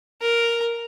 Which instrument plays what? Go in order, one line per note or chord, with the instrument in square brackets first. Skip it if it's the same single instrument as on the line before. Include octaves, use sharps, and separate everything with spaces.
[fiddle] A#4